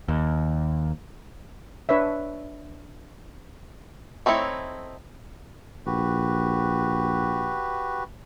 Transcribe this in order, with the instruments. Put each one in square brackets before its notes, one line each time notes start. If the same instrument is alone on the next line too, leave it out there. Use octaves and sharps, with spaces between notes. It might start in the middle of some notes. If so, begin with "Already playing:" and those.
[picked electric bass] D#2
[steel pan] D4 B4 C#5 E5
[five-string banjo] A3 C4 D#4 E4 C#5
[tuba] A#1 [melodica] F#4 G4 B4